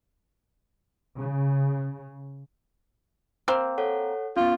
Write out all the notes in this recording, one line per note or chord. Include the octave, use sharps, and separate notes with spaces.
C#3
A#3 C4
A4 C#5 F#5
B3 C#4 F4